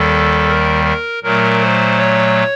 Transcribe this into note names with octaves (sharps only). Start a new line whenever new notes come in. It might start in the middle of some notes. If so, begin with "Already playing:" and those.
Already playing: D#2 D#3 G3 A4
A#4
A#4
A#2 F#3 A3 A#4
C5
C#5